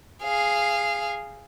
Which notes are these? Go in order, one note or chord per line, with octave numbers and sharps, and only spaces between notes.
G#4 F5